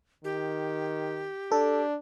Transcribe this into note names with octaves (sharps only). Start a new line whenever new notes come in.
D#3 G4
D4 A4